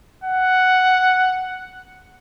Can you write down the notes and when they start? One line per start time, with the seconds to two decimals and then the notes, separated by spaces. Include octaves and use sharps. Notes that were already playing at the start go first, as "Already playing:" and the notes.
0.24 F#5